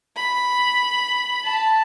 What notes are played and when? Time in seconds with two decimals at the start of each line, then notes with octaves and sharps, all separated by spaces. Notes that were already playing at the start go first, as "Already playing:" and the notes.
0.17 B5
1.45 A5